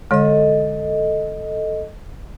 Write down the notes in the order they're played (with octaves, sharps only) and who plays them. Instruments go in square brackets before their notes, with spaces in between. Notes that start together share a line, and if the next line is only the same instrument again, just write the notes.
[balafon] D3 G#3 [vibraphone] A4 D#5